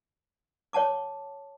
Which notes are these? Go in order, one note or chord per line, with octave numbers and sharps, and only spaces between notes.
C#5 F#5 A5 D6